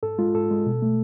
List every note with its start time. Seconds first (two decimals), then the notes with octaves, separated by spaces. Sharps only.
0.03 G#2 A4
0.18 G#3 F4
0.34 G#2 A4
0.51 G#3
0.66 B2
0.82 A3